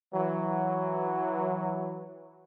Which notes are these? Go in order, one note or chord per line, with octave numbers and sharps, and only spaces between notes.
E3 F#3